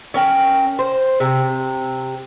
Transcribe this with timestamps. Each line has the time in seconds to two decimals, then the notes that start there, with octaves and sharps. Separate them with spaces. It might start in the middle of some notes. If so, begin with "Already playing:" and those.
0.14 C#4 A#4 G5
0.79 C5
1.20 C3